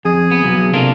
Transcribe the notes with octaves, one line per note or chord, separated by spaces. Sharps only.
F2 G#4
B3
B2 F#3
C3 A#3 D4 F4 A4